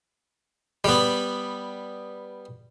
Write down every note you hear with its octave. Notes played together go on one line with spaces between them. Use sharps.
G3 B3